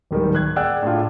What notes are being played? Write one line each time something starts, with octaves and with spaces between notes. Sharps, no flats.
D1 D#3 G3
F#6 G#6
G#4 D5 F#5 G5 E6 F#6
A2 D4 F4